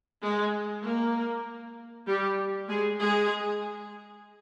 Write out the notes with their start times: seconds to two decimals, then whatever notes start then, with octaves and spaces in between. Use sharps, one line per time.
0.22 G#3
0.84 A#3
2.07 G3 G4
2.69 G#3 G#4
3.00 G#3 G#4